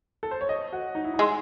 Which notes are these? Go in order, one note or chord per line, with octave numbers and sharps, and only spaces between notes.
A4
C5
C#5
D#5
F#4
D#4
E4
D#4
G#3